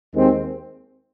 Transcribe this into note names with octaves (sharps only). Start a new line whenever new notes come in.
D#2 D#3 G#3 C4